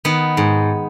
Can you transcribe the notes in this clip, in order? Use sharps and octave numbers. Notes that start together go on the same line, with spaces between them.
D#3 B3
G#2